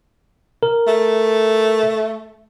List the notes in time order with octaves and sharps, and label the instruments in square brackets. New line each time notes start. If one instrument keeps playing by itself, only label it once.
[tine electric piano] A#4
[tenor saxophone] A3